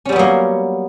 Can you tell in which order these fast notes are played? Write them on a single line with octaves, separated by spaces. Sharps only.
C#4 G3 B3 F#3 A#3